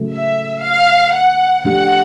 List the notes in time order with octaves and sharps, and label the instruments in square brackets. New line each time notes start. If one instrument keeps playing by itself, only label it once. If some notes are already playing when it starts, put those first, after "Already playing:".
Already playing: [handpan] C#3 F#3 A3
[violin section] E5
F5
F#5
[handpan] F3 A3 D4 G4 [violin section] F#5